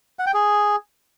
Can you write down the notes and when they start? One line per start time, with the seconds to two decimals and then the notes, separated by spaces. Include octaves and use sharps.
0.19 F#5
0.27 G5
0.34 G#4